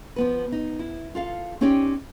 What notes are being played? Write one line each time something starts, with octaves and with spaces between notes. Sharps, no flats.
F3 B3 B4
D#4
E4
F4 A4 F5
C4 C#4 D#4 G4 C#5 D5